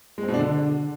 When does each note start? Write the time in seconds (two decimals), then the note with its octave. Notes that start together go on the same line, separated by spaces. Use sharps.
0.18 G#3
0.23 C4
0.28 B2
0.34 D4
0.39 D3